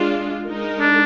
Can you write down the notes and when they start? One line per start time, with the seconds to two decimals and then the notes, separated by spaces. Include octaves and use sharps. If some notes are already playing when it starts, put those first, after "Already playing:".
Already playing: G#3 D4 F4
0.45 G#3 D#4 A#4
0.80 D4